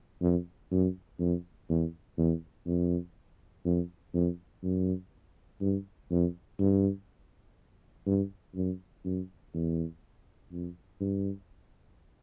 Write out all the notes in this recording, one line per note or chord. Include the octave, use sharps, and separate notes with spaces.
F2
F#2
F2
E2
E2
F2
F2
F2
F#2
G2
F2
G2
G2
F#2
F#2
E2
F2
G2